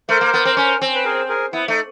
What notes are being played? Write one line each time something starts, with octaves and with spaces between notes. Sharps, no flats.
A3 A#4 C5
A#3
B3
C4
C#4
C4
B4
G#4 A#4
G#4 A#4
B3 E4
A3 D#4